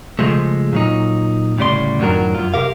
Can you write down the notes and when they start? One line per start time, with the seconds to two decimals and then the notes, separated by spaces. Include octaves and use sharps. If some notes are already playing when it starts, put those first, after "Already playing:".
0.19 C#3 F3 G#3 A3
0.73 A#2 F#3 D#4
1.57 D2 A2 C#3 G3 D5 C6
1.99 F#2 A2 D#3 F#3 D4 A#4
2.34 F#2 F4
2.54 C3 G4 A#4 F5